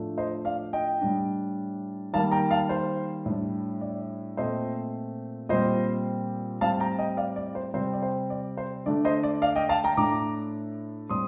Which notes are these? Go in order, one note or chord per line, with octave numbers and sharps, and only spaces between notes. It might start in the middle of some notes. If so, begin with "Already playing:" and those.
Already playing: A2 F3 A3 D4
C5 D#5
D5 F5
D#5 G5
A2 G3 D4
D#3 G3 A#3 F5 A5
G5 A#5
F5 A5
C5
A2 G3 D4
D5
A#2 A3 C4 C5 D#5
A#2 G3 C4 C5 D#5
A2 G3 C4 F5 A5
G5 A#5
D#5 G5
D5 F5
D5
C5
C3 G3 C4 C5
D5
C5
D5
C5
D3 A3 D4 D5
C5 D#5
D5
D5 F5
D#5 G5
F5 A5
G5 A#5
A2 A3 D4 A#5 D6
A2 G3 C4 C6 D#6